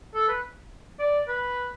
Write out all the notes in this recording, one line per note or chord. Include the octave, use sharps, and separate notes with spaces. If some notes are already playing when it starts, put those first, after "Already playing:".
A4
B4
D5
B4